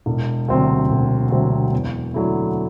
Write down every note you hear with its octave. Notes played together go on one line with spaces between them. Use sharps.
E1
D2 C3 F#3 C4
E1
D2 C3 F#3 C4
E2
D3 F#3 A3 E4